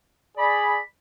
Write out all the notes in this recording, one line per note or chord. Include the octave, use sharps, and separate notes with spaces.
G#4 D5 B5